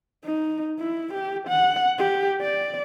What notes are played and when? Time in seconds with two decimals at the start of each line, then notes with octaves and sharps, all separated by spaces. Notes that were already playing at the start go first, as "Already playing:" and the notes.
0.24 D#4
0.79 E4
1.14 G4
1.48 F#5
1.99 G4
2.42 D5